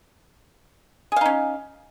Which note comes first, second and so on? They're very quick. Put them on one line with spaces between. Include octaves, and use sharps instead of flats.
G#4 F5 D#4 C#4